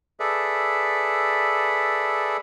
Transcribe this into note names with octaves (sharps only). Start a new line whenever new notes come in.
G#4 A4 B4 D5 E5